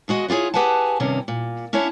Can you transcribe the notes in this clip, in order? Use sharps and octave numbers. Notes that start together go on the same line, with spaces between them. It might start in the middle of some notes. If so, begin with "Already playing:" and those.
D#2 G#3 F#4 D#5
E4 F4 G4 G#4 C#5
G4 G#4 B4 F#5 G#5 A5
G2 C3 D#3 C#4
A#2
C#4 D4 E4 C#5